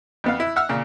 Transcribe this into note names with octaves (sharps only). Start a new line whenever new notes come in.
F2 B3 F5
E4
E5 F#5 E6 F6
A#2 C#3